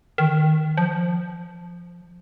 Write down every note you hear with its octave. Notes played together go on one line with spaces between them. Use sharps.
D#3
F3